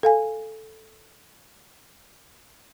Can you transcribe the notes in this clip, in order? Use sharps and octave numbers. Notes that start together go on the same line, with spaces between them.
A4 F5 G#5